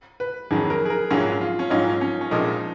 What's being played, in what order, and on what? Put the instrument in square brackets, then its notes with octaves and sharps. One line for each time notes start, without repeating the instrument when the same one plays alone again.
[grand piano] B4
[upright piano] F2 D#3 F#3 [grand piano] G#4
[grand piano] A#4
G#4
A#4
[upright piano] A#1 G#2 F#3 C#4 F4 [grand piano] G#4
[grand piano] F4
C#4
[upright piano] A#1 G#2 F#3 C#4 F4 [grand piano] D#4
[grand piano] C#4
C#4
[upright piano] A#1 A#2 F3 G#3 [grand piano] D#4